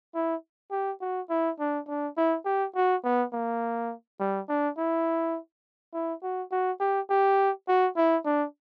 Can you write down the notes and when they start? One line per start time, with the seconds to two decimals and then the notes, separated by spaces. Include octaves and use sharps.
0.15 E4
0.72 G4
1.01 F#4
1.30 E4
1.59 D4
1.88 D4
2.17 E4
2.45 G4
2.75 F#4
3.04 B3
3.33 A#3
4.20 G3
4.49 D4
4.78 E4
5.93 E4
6.23 F#4
6.51 F#4
6.80 G4
7.10 G4
7.68 F#4
7.97 E4
8.25 D4